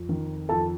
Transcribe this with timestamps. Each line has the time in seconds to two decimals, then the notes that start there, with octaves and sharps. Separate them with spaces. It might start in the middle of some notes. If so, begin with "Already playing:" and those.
Already playing: F2
0.09 D#3
0.49 F2 A4 A5